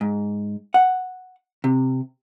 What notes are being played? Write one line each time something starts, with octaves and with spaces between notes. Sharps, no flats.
G#2
F#5
C3